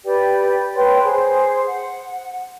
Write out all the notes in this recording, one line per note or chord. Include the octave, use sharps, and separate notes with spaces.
G4 B4 D5 G5
B4 C#5 G5 C6
G#4 C5
F#5